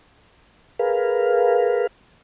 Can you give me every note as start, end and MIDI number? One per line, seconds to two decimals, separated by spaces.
0.79 1.87 68
0.79 1.87 70
0.79 1.87 71
0.79 1.87 77